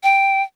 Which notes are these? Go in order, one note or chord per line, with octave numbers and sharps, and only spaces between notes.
G5